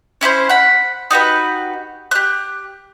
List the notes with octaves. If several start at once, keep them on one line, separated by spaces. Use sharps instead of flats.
C#4 E4 A4 C5
F#5 B5
D#4 F#4 G4 B4
G4 F#6